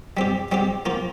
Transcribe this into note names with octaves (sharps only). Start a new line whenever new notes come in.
G3 C4 G4
G3 C4 G4
F3 A#3 F4